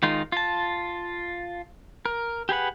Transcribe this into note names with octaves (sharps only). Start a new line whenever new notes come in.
D#3 G#3 D#4 F4
F4 A5
A#4
G4 G#4 B4 F#5